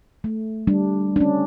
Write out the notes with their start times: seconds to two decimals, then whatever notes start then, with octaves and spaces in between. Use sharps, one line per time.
0.24 A3
0.67 G3 D4
1.16 C#4 D4